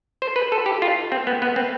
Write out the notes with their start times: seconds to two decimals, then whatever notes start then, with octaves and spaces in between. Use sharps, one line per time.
0.22 C5
0.36 B4
0.52 A4
0.66 G4
0.82 F4
1.12 C4
1.27 B3
1.42 B3
1.56 C4